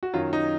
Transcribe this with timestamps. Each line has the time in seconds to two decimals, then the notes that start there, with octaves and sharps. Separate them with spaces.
0.03 F#4
0.14 F#2 D#3 F#3 F4
0.33 D#4